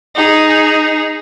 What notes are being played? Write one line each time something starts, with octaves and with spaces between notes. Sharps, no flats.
D#4 G#4